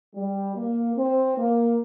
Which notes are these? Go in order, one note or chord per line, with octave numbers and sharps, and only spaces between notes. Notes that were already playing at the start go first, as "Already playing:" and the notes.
G3
A#3
C4
A#3